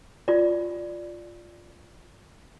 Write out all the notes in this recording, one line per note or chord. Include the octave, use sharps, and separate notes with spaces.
F4 D5